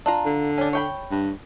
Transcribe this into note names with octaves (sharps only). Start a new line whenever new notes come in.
D4 F4 A#5
D3
C#4 D4
C#5 G5 B5
G2